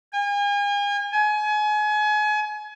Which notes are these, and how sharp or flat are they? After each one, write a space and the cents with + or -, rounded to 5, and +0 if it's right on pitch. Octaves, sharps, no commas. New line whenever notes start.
G#5 -40
G#5 +30